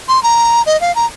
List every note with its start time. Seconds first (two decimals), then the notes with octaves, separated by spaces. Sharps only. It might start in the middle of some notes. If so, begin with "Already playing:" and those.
0.08 C6
0.23 A#5
0.66 D#5
0.81 F5
0.95 A#5